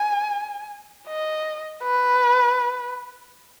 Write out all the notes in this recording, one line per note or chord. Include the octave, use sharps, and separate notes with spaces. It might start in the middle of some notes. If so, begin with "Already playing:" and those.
Already playing: G#5
D#5
B4